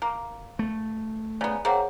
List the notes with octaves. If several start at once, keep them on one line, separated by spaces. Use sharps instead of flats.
A#3
A3
C#3 B3 D5 G#5 A#5
A#3 C4 G#4 C#5 F#5